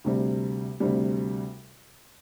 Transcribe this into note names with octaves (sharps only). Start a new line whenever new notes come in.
D2 C3 G3
D2 C3 G3